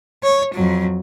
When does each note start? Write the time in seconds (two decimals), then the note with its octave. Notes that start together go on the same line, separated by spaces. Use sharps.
0.23 C#5
0.54 F2 F#3